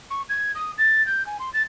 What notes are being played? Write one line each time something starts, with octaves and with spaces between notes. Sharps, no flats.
C#6
G#6
D#6
A6
G6
G#5
C6
A6